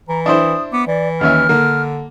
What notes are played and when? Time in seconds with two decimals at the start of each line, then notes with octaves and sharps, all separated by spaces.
0.09 E3 A#5
0.26 D4 E4 C5 D#6
0.73 B3 D6
0.87 E3 D5
1.21 D#2 C#4 E5 F6
1.49 D3 A#3